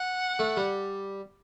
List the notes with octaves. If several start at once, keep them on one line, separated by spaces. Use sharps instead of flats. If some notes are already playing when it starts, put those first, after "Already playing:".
Already playing: F#5
A3
G3